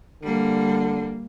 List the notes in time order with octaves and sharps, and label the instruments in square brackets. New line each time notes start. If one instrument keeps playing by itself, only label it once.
[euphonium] D3 [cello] G3 A#3